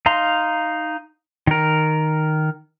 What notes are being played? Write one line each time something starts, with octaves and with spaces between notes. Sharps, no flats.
D#4 F5 A#5 C6
D#3 A#4